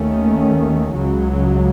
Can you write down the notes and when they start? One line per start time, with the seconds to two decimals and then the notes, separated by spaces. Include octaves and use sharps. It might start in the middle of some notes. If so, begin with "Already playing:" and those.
Already playing: D#2 D#3 A3 C#4
0.95 C#2 C#3 F#3